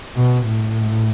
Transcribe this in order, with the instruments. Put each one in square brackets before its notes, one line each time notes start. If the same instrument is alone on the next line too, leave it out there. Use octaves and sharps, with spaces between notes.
[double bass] B2
A2